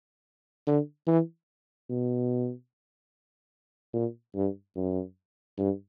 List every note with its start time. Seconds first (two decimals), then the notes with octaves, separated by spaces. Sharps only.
0.67 D3
1.07 E3
1.90 B2
3.94 A#2
4.35 G2
4.76 F#2
5.58 G2